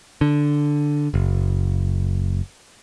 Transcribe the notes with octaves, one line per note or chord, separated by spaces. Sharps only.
D3
F#1